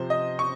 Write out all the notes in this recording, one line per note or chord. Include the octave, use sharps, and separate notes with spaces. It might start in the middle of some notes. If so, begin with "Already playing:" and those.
Already playing: C3 F3 C5
D#5
C#6